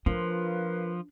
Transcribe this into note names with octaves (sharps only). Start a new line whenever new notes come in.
F3 A#3 D4 F4 B4